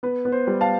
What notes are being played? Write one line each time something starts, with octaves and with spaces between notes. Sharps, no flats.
B3 B4
B3
C5
G3
F5 A5